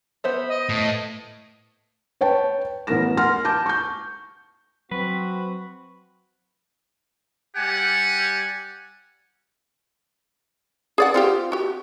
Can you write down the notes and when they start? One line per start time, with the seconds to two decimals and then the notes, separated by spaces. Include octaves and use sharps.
0.24 B3 C5 E5
0.48 D#5
0.69 A2
2.21 B4 C#5 G5 A5
2.87 A1 B3 A#4 A#6 E7
3.17 F#5 C6 F6 A#6
3.45 A5 D6 G6
3.66 C#6 G6
4.91 F#3 C4 F#4 B4
7.56 G3 G4 D5 F#5 G#5
10.98 G#4 D5 F#5
11.14 C4 F4 G4
11.52 F#4 G4